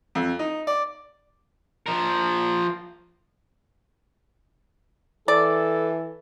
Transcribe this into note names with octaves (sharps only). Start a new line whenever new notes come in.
F2
D#4
D5
F3 A#4
E3 A4 D5